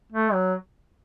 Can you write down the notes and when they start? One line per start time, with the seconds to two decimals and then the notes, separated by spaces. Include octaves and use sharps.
0.12 A3
0.33 F#3